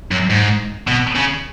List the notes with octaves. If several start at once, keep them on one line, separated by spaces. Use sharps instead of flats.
F#2
G#2
B2
C#3